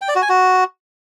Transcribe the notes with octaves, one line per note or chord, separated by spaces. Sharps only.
G5
D5
F#4
G#5
F#4